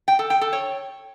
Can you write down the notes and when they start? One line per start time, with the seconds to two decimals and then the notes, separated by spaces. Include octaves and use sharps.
0.08 G5
0.19 A4
0.30 G5
0.41 A4
0.53 C#5